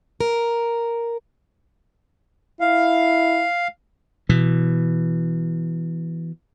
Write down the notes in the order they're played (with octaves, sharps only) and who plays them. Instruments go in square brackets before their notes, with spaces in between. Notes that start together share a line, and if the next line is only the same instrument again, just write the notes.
[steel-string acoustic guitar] A#4
[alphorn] E4 [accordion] F5
[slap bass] B2 E3